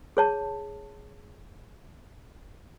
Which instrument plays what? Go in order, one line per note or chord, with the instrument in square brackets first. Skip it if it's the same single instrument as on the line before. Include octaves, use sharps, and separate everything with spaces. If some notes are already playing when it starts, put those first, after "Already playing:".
[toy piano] G#4 C#5 A5